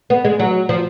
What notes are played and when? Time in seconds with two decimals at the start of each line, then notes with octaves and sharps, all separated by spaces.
0.10 B3
0.25 G#3
0.39 F#3
0.69 F3